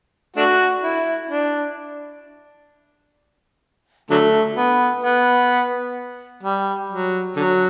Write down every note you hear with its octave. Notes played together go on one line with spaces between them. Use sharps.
A3 D4 F#4
E4
D4
D3 F#3 A3
B3
B3
G3
F#3
D3 F#3